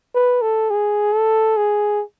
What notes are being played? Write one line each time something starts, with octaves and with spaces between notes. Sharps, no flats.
B4
A4
G#4
A4
G#4